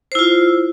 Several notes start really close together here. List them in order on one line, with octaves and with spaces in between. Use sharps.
C5 E4 F4